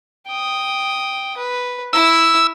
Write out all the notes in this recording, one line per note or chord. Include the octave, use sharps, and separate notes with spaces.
G5 D#6
B4
E4 E6